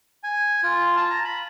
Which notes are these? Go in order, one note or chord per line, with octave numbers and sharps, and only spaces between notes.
G#5
F4
A5
A#5
B5